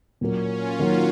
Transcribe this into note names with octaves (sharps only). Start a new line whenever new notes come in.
A#2 F#3 A#3 C#4
F4
D#3 F#3 A#3 D#4 F#4